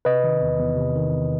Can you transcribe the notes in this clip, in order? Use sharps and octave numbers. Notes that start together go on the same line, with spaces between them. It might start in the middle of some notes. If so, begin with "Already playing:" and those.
C3 B4 D#5
D#3
E2
E2
C3
D#3
E2